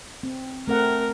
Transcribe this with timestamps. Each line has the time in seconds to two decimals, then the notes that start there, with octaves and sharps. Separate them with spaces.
0.23 C4
0.68 A3 C4 A#4 F#5